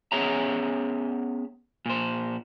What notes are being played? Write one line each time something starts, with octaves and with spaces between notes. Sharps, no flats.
B3 C#4 G#4 C#5 E5 A#5
A#2 C5